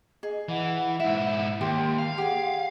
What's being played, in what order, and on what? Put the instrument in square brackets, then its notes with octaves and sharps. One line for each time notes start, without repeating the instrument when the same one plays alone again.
[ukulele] G#4 [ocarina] D#5
[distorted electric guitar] E3 [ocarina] F#5
[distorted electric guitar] G#2 E4 [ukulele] E5
[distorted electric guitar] D#2 [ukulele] G4 [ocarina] C6
[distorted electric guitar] F5
[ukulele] G4 G#4 [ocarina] F#5